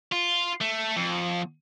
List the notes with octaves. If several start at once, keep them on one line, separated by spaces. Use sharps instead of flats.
F4
A3
F2